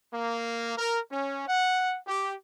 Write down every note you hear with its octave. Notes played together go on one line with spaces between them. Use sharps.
A#3
A#4
C#4
F#5
G4